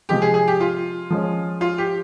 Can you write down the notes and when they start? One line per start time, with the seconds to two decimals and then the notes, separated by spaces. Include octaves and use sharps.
0.09 C3 F3 G#3 G4
0.22 G#4
0.34 G#4
0.48 G4
0.60 F4
1.10 F3 G#3 C#4
1.61 F4
1.78 G4